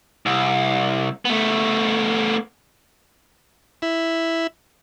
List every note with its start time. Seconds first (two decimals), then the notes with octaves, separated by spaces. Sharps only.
0.26 C2
1.25 A3 B3
3.82 E4